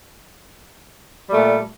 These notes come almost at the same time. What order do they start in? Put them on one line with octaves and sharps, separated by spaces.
G3 A3 A#2